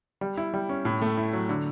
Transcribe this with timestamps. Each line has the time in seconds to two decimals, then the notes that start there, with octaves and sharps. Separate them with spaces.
0.21 G3
0.37 E4
0.54 G3
0.69 C#4
0.85 A2
1.02 A3
1.17 E4
1.33 F#3
1.49 D3